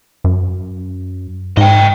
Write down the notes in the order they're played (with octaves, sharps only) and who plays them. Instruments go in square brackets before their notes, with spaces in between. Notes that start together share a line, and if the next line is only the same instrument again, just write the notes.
[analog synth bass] F#2
[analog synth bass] G#2 [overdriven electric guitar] D#5 G5